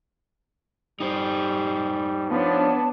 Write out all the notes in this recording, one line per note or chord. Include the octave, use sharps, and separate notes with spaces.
G3 D#4 G4 C5
F3 B3 D4 C#5 A5